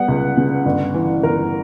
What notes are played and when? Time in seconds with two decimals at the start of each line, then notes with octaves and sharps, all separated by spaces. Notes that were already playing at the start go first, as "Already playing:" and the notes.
Already playing: G3 B3 F#5
0.08 C#2
0.37 C#3
0.66 G1
0.94 E3
1.23 G1 A#4